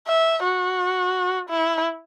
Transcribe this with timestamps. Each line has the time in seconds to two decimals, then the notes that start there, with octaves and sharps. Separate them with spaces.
0.08 E5
0.44 F#4
1.49 E4